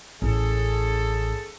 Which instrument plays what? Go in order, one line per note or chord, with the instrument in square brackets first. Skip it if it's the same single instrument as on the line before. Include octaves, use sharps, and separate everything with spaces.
[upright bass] A1 [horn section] C#4 G#4 A4